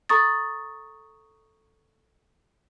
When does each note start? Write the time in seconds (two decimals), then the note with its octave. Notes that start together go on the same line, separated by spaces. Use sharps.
0.09 A4 A#5 C#6 D#6 A6